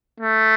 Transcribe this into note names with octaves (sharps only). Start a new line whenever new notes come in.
A3